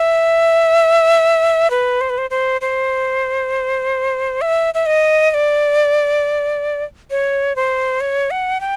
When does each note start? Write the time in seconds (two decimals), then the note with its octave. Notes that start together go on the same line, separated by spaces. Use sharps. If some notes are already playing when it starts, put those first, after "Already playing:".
Already playing: E5
1.70 B4
2.01 C5
2.10 B4
2.18 C5
2.30 C5
2.61 C5
4.41 E5
4.74 E5
4.86 D#5
5.31 D#5
5.34 D5
7.10 C#5
7.56 C5
8.01 C#5
8.31 F#5
8.61 G5